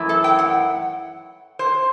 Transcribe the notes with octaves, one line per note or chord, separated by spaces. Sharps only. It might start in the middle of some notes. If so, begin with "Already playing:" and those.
Already playing: F#2 E3 A3 E4
A4
G5
F#5
C5